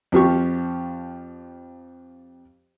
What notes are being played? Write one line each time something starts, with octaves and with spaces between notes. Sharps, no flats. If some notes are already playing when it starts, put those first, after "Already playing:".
F2 F3 G4 C#6